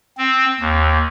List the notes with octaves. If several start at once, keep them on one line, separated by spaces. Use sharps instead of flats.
C4
D#2